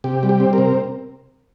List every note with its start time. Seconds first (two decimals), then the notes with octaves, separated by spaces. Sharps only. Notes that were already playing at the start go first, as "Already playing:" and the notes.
0.04 C3 G4
0.23 G3
0.29 G4
0.40 C4
0.53 A#4
0.58 C3